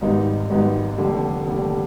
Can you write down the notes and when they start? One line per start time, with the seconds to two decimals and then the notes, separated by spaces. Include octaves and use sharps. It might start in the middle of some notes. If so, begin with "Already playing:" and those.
0.01 G#1 G#2 G3 B3 D#4
0.50 G#1 G#2 G3 B3 D#4
0.98 F1 D#2 D3 G3
1.47 F1 D#2 D3 G3